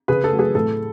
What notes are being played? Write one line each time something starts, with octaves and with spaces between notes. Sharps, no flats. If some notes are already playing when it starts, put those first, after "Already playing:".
C#3 G#4 B4
A4
F#3 A3
G#4 B4
A2 A4